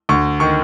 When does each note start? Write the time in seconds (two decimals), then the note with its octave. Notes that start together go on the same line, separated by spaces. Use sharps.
0.09 D2 C#6
0.40 D#3 C#6